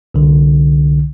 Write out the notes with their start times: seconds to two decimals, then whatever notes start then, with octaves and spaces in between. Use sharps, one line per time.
0.14 C2 D3